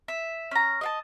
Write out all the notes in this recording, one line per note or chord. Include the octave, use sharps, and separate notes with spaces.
E5
C#4 A#5
D#5 F5 A5